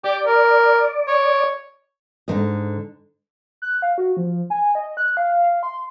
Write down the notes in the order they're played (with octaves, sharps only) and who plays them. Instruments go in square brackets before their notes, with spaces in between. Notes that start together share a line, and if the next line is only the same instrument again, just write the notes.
[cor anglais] G4 [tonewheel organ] D5
[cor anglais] A#4
C#5
[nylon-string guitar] G#2 D3 D#3 D#5
[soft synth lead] F#6
F5
F#4
F3
G#5
D#5
F#6
F5
F5
C6